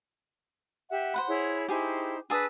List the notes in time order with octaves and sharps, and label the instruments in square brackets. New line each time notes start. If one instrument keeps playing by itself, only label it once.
[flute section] G4 E5 F#5
[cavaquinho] C5 F#5 B5
[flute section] E4 G#4 C#5
[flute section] D#4 E4 C5 [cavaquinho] G4 G#4
[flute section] D4 B4 E6 [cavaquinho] G#4 A5 D#6